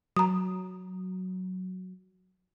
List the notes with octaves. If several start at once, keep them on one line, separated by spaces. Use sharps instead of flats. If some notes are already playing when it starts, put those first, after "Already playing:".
F#3 A#5 D#6